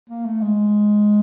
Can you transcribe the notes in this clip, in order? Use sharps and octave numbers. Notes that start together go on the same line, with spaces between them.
A#3
A3
G#3